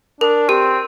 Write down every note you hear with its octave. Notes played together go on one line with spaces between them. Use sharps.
D4 A#4
C4 G4